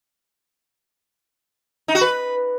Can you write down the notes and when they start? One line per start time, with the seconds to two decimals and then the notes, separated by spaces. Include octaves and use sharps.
1.88 D#4
1.95 F#4
2.01 B4